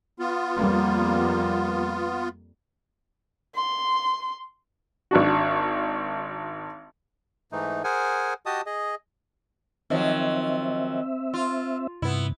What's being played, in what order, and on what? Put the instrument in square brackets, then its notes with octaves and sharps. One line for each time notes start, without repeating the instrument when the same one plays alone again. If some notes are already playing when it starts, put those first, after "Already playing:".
[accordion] B3 F4
[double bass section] F2 G3 A#3
[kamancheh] C6
[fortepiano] G#1 D4 F#4
[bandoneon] G#2 E3 A3 D#4
G#4 A#4 C5 F#5 G#5
F#4 G4 D#5 A5 D#6
G#4 D#5
[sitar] D#3 F3 F#3 [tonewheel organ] C4 E5
[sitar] F4
[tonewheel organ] G2 C3 [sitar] B3 E4